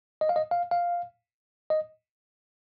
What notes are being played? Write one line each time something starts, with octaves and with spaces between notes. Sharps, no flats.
D#5
F5
D#5
F5
F5
D#5